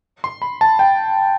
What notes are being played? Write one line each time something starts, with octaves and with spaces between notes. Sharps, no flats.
C6
B5
A5
G5